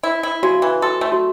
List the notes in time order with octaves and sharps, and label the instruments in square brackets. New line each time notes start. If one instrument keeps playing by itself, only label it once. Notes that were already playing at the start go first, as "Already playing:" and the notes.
[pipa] E4
E4
[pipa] C#3 [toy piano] F#4
[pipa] E3
[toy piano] F#4 [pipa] A4
[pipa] A3
[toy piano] F#4